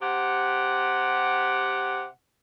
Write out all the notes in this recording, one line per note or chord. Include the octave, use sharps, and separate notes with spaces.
C3 G4 F#5